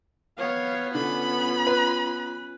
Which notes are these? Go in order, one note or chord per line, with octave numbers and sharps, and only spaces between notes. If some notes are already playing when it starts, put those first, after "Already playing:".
B3 C#5 F5
D3 C#4 F4 B5
B4